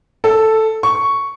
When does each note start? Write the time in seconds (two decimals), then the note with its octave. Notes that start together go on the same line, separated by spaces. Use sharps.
0.24 A4
0.83 C#6